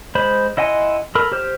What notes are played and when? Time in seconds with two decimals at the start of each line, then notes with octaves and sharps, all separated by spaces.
0.15 G#3 C5 B5
0.57 E4 D#5 F#5 G#5 C6
1.15 A4 A#4 B5
1.32 G4 C5 F6